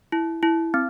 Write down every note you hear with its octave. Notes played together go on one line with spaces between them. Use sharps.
E4
E4
C4